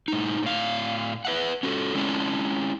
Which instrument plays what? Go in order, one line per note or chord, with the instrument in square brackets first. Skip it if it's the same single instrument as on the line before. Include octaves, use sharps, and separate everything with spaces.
[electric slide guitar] A2 D#4
A2 F5
B4 E5 F#5
C#4 F#4 A4
G#3 C#4 D4 E4